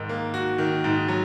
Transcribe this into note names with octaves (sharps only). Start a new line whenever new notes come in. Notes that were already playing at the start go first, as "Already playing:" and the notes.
Already playing: G#2 D#3
A#3
F#4
D#3
G#2
F#3